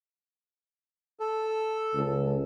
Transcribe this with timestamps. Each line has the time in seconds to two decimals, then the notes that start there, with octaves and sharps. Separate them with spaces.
1.20 A4
1.94 C#2